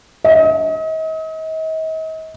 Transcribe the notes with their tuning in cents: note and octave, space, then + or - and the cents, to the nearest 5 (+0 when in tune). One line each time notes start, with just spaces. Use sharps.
D#5 +40